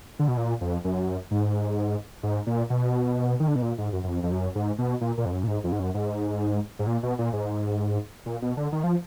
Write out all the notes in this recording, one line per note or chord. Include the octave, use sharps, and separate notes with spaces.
D3
B2
A#2
F2
F#2
G#2
G#2
A#2
B2
D#3
D3
B2
A#2
G#2
F#2
F#2
F2
F2
F#2
G#2
B2
A#2
A#2
F2
F#2
A#2
G#2
F2
G#2
F#2
G#2
G#2
A#2
B2
A#2
G#2
A#2
B2
D3
D#3
F3